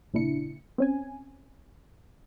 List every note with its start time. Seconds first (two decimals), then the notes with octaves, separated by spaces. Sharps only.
0.14 G#1 A#2 C#3 D4 E4 C#7
0.78 C4 C#4 G#5